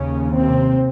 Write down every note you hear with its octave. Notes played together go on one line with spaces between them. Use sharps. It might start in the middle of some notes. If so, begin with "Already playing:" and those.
Already playing: D#2 C#3 C#4
C3 C4